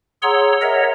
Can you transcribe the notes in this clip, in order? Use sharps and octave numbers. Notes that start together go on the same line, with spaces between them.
G#4 C#5 F#5 A#5 C6 E6
A#4 C#5 D#5 E5 F#5 A#5